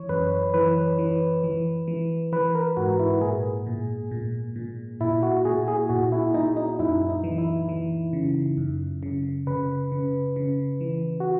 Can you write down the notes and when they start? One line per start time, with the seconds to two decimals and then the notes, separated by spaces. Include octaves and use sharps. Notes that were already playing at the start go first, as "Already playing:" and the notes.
Already playing: E3 C#5
0.09 F#2 B4
0.54 E3 B4
0.99 E3
1.44 E3
1.88 E3
2.32 E3 B4
2.55 A#4
2.77 G#2 F#4
2.99 E4
3.22 A#2 G#4
3.67 A#2
4.11 A#2
4.56 A#2
5.01 A#2 E4
5.23 F#4
5.45 A#2 G#4
5.68 G#4
5.89 A#2 F#4
6.12 E4
6.34 A#2 D#4
6.57 D#4
6.79 F#2 E4
7.09 D#4
7.24 E3
7.38 E4
7.69 E3
8.13 C#3
8.58 F#2
9.03 C#3
9.47 C#3 B4
9.92 C#3
10.36 C#3
10.81 E3
11.20 F#4